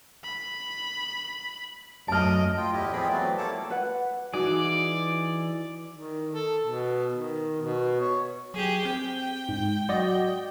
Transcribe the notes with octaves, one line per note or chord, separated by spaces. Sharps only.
B5
F#2 A3 D#5 A5 F6 D7
F4 G5
E2 A2 E4 G4 D#5
F3 B3 C4 G#4 G5 B5
E3 F#3 A3 C4 D5
G3 A#3 A4 C#5 A5 D6
B4 F#5
E3 D#4 F#4 G#4 D5
D#3
A4
B2
D#3
B2
C#5
F#3 G4 G#4
C4 G5
G#2
F#3 F#4 D5 D#5